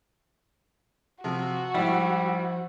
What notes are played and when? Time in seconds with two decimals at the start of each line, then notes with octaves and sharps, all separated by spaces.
1.24 C3 F3 F#4
1.74 G#2 F3 G3 E4